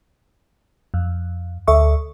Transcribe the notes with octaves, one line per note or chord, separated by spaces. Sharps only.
F2
D2 A4 E5 C#6